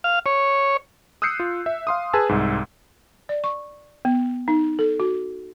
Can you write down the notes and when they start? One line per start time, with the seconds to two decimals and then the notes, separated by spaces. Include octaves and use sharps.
0.04 F5
0.26 C#5
1.22 D#6 E6 F#6 G6 C7 C#7
1.40 F4
1.66 E5
1.87 F5 C6 D#6
2.13 G#4 B4 G#5 A5 E6
2.29 C2 G#2
3.29 D5
3.44 C#6
4.05 B3
4.48 D#4
4.79 A4
5.00 F#4